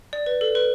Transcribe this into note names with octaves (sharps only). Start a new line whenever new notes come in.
D5
B4
A4
B4